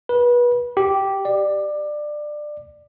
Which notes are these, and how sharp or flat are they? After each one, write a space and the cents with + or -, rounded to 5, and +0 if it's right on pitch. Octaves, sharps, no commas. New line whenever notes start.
B4 -30
G4 -5
D5 +20